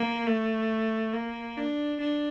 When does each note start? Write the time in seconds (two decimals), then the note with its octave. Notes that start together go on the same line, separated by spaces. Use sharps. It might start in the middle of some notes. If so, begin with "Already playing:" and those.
Already playing: A#3
0.27 A3
1.14 A#3
1.57 D4
2.01 D4